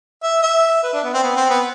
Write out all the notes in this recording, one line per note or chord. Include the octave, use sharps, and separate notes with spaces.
E5
E5
B4
D4
B3
C4
B3
C4
B3